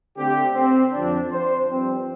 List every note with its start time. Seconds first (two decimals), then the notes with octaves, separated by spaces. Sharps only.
0.17 D3 A3 C4 G4
0.55 C4
0.92 F2 D3 F3 C4 D4
1.31 C5
1.68 G2 F3 C4